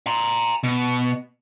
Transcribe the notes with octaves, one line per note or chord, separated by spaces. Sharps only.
A#5 C6
B2